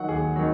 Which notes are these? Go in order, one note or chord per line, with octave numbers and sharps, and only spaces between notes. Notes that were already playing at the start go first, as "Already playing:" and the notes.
Already playing: D#3 F#3 F#5
D#2 G#4
D#3 F#3